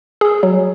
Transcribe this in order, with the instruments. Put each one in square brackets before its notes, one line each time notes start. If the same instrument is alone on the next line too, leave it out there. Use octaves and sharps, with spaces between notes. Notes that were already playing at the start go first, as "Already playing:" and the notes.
[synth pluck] G#4
F#3